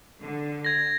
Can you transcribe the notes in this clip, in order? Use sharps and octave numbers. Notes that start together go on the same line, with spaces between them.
D3
G#6 A#6